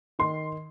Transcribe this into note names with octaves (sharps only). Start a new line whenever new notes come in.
D#3 C6